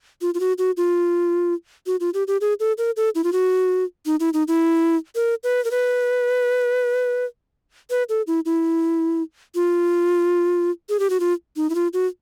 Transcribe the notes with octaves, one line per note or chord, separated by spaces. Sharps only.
F4
F4
F#4
F#4
F4
F#4
F4
G4
G4
G#4
A4
A#4
A4
E4
F4
F#4
D#4
E4
D#4
E4
A#4
B4
A#4
B4
B4
A4
E4
E4
F4
G#4
G4
F#4
F4
D#4
E4
F4
F#4